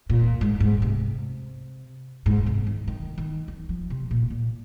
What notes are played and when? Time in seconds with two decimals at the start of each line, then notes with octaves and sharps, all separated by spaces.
0.10 A#2
0.41 G#2
0.60 G#2
0.82 C3
2.26 G#2
2.46 C3
2.67 D#3
2.88 D#3
3.18 D#3
3.48 D#3
3.69 F3
3.90 C3
4.11 A#2
4.30 A#2